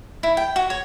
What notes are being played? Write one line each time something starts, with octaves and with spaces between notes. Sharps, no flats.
E4
G5
F#4
C#5